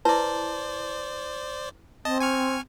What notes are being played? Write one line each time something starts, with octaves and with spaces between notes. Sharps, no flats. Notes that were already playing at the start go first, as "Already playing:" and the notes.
E4 B4 C5 D5 A5
C4 D#5 A5
G#5 C#6 F6